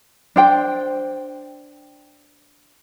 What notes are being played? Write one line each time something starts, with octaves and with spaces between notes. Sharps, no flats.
D4 C5 G5